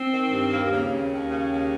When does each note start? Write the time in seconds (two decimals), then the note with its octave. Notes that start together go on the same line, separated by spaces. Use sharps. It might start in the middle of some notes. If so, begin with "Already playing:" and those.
Already playing: C4
0.13 D#3
0.32 G2
0.52 D#2 A#3
0.66 C4
0.72 C#3 A#3
0.91 D#2 C#4
1.11 D#2
1.31 C#3
1.51 D#2